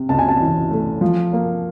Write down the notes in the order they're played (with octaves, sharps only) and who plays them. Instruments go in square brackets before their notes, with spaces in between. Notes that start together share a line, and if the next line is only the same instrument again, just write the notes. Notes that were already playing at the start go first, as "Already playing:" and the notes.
Already playing: [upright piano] C3
C#2 A5
G#5
A5
E3
A3
F3
A#3